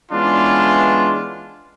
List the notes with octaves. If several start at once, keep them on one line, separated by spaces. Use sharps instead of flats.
E3 G#3 B3 C#4 D4 F4